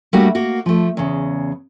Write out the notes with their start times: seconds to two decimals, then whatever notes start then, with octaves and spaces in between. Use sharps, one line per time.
0.13 G3 A3 A#3 D4 F#4
0.35 A#3 F#4
0.66 F3 A3
0.97 E2 C#3